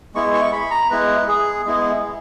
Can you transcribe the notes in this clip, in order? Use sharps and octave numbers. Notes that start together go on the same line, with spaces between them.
G#3 B3 E4 C#6
C#6
B5
A#5
G#3 B3 E4 B4
G#4
G#3 B3 E4